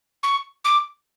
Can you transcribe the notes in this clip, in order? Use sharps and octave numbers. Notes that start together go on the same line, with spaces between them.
C#6
D6